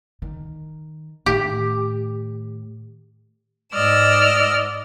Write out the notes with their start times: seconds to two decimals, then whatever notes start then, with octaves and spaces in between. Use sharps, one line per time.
0.22 D#3
1.26 A2 D#3 G4
3.74 G#2 D5 D#5 E6 F6